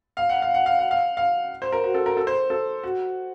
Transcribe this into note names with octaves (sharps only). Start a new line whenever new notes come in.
F5
F#5
F5
F#5
F5
F#5
F5
F5
C5
A#4
F#4
A4
A#4
A4
C5
A4
F#4